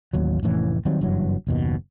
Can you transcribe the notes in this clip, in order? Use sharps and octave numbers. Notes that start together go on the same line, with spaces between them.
A1 D#2 F#3
F1 A2 E3 C#4
D#3 F#3 G3 C4
F#1 G2 E3 F#3
F#1 D#2 B2